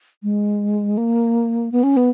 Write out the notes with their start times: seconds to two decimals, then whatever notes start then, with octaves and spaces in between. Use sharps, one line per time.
0.23 G#3
0.98 A#3
1.72 B3
1.83 C#4
1.97 B3